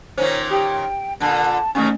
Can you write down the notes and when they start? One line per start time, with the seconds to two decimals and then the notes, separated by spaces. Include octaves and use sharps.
0.18 A#2 D#3 C#4 C5 C#5
0.50 G4 G5
1.20 A#2 D3 A5
1.75 D#2 C#3 E3 A3 C#4 C#6